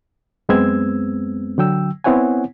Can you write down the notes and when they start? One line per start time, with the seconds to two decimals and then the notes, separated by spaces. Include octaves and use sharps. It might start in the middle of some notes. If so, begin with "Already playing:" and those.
0.49 F#2 G#3 B3 C4 E6 G#6
1.58 D3 F#3 G5 E6
2.04 B3 C4 E4 C#5 F#5 G#5